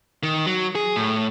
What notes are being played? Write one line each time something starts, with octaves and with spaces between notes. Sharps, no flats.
D#3
F#3
G#4
A2